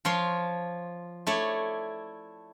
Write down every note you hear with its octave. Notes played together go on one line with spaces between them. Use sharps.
F3 F4 C#5 C6
A3 E4 C#5 D5